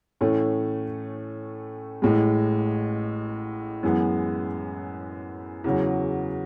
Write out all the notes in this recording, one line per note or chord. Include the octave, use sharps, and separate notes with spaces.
A2 E3 A3 C#4
A1 A2 G#3
F#2 E3 G#3 B3
E2 C#3 F#3